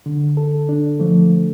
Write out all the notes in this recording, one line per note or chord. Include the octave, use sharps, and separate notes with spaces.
D3
A4
D4
F3 A3